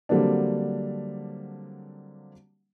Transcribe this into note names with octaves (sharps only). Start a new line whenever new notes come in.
D3 F#3 G3 A#3 C4 D4